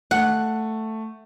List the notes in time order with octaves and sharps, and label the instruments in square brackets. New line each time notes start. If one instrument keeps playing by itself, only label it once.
[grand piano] A3 [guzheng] F#5